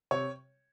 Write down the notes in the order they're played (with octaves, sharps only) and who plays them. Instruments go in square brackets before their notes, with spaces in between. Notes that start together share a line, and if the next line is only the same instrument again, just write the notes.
[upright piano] C3 C#5